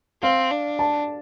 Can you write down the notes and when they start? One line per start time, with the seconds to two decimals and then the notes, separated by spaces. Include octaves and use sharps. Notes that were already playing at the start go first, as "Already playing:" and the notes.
0.22 C4 F5
0.51 D4
0.79 A5